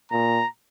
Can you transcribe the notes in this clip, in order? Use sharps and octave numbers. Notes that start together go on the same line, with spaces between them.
A#2 A#5